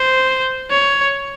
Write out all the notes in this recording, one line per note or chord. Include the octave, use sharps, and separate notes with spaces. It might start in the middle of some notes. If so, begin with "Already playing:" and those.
Already playing: C5
C#5